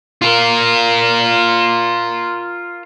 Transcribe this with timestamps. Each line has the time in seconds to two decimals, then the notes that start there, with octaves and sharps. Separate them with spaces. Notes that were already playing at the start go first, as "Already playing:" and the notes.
0.22 F4 A#4